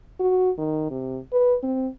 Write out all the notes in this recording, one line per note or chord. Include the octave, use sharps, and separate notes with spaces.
F#4
D#3
C3
B4
C4